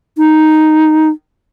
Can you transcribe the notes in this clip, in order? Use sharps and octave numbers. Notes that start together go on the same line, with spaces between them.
D#4